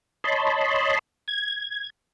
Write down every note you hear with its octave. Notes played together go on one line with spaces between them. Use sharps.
C#5 D#5 A5 B5 C6
G#6